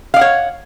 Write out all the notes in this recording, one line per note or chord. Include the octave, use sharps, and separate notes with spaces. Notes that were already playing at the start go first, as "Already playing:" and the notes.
C#5 D5 F5 F#5